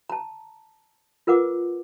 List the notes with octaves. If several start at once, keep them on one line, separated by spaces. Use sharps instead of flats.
A5 A#5
F4 A#4 B4 F#5 D6